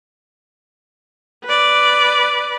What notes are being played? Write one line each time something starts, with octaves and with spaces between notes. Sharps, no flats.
B4 D5